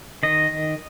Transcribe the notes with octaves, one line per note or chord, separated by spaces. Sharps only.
D#3 D#5